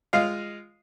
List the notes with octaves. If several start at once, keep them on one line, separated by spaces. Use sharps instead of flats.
G#3 F4 D#5 F5